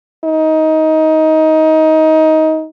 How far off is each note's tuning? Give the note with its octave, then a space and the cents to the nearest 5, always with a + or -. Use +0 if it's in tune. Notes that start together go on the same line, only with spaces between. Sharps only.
D#4 +20